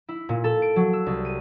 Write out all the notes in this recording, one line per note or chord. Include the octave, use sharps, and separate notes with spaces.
E4
A#2
A4
D7
F#3
E6
C2
D#7